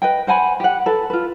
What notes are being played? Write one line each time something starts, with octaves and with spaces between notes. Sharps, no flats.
B4 D#5 G5
C5 F#5 G#5 B5
G4 F#5
A4 B4 A5
F4 B4